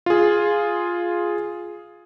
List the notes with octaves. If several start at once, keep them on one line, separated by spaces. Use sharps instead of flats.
F4 G#4